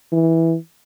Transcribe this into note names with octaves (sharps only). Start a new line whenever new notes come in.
E3